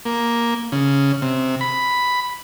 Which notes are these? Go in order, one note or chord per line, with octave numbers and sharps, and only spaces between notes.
A#3
C#3
C3
B5